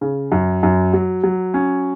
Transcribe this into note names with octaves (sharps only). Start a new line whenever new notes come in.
C#3
F#2
F#2
F#3
F#3
C#4